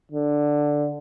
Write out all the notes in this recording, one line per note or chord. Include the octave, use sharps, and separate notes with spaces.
D3